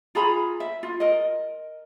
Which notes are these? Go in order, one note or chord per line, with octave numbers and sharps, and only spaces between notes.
F4 G#4 A#5 B5
E5
F4
A#4 D#5